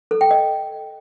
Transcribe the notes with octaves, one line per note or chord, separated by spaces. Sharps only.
A4
G5
D#5